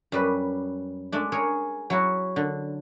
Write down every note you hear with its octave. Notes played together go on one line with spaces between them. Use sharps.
F#2 G3 B4
G#3 A3 D4
G#4 A#4 C#5
F#3 E4 F#4
D3